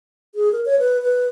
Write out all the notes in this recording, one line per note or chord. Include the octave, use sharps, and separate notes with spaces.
G#4
A#4
C#5
B4
B4